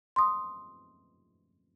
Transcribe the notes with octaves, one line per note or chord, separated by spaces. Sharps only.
C6 D#6